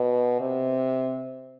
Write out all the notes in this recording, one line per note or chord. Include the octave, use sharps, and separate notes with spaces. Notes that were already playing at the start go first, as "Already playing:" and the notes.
Already playing: B2
C3